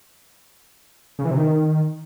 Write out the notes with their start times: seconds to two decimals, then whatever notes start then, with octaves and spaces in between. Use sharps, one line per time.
1.19 C#3
1.25 E3
1.31 C3
1.37 D#3